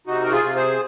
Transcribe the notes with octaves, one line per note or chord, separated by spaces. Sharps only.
C3 D#4 F#4
A#4
F4 G#4
C3
G#4 C5